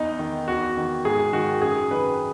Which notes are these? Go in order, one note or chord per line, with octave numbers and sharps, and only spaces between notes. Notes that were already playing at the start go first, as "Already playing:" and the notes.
Already playing: E2 D#4
D#3
E2 F#4
D#3
G#2 G#4
D#3 F#4
F#2 G#4
D#3 B4